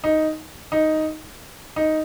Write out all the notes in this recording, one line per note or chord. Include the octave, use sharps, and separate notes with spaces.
D#4
D#4
D#4